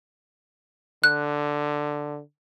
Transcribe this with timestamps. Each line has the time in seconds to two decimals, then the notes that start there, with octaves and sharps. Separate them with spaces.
1.04 D3 F#6